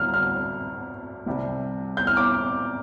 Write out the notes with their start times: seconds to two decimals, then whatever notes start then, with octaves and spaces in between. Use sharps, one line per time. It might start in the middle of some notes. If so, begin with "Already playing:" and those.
Already playing: D2 D3 G3 F6
0.14 F6
1.26 C2 C3 G3
1.97 G6
2.07 F6
2.17 D6